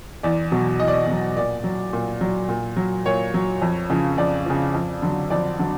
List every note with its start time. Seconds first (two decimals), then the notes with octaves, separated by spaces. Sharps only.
0.23 E2 D5
0.52 B2 F#3
0.80 E2 D#5
0.88 D5
0.94 D#5
1.07 B2 F#3
1.37 A#2 D5
1.64 F#3
1.93 A#2
2.21 F#3
2.49 A#2
2.76 F#3
3.06 A#2 C#5
3.34 F#3
3.62 F2
3.90 C#3 F3
4.18 F2 D5
4.46 C#3 F3
4.74 F2
5.02 D3 F#3
5.30 F2 D5
5.59 D3 F#3